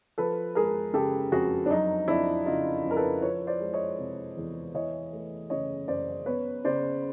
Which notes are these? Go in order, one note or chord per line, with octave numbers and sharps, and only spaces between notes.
F3 A4 B4
G#3 G#4 A#4
C#3 G4 A4
F2 F#4 G#4
D4
F#3 D#4
F2 D4 E4
C#3 D#4 F4
F2
A#4
A4 B4
F3 B4 C#5
C5 D5
G#3
C#5 D#5
C3
E2
E3 C#5 D#5
A3
C#3 C#5 D#5
F#2 C5 D5
B3 B4 C#5
C#3 C5 D5